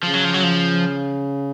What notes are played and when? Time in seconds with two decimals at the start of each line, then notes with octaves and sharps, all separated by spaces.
0.03 C#3 F3
0.14 F#3
0.24 F3
0.34 F#3
0.43 F3